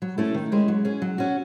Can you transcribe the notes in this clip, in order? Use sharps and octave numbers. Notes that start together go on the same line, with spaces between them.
F#3
A3 C#4 E4 A4
D#3
G#3 C#4 E4
F#3
C#4 G#4
F#3
C#4 F#4